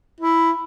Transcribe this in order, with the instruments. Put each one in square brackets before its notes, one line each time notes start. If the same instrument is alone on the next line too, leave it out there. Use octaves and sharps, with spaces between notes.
[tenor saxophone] E4